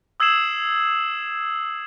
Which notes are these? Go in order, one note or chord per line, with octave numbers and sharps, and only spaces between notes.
D#6 E6 G#6 C7 E7 F#7